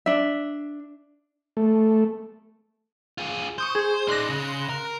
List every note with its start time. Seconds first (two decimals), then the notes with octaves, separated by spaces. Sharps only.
0.06 D4 E5
1.57 A3
3.18 F4 G#4
3.58 C5 C#6 D#6 G6
3.75 G#4
4.08 D#4 D5 C6 F#6 A#6
4.30 C#3
4.70 A#4